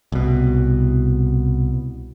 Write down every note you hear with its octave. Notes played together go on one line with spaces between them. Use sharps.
C2 B2